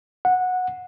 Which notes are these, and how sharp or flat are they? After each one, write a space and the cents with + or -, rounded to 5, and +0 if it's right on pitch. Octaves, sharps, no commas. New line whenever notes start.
F#5 -15